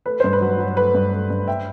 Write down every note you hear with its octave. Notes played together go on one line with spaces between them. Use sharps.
A3 B4
G2 C5
B4
F#3
F#3
A3 B4
G2
A3
G2
E5 G5